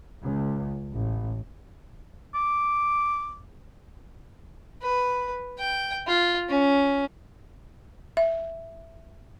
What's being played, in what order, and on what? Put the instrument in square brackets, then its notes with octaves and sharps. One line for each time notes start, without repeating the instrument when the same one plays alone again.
[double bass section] C#2
A1
[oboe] D6
[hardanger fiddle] B4
G5
F4
C#4
[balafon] E5